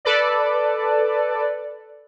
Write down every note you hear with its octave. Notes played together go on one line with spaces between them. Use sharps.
A4 B4 D5